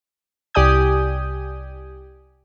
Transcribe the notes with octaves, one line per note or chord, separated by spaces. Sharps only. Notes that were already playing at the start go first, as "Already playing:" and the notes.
C2 G4 D5 G#5 D#6 G6